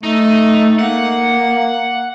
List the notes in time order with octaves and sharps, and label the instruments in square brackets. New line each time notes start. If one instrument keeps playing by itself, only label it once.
[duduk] A3 [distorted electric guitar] D#4
[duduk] A#3 [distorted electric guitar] F#5